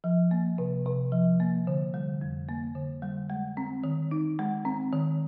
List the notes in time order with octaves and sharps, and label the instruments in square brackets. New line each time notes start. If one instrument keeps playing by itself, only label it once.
[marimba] F3
A#3
C3
C3
F3
A#3
D3
G3
F2
A#3
D3
G3
G#3
C4
D#3
D#4
G#3
C4
D#3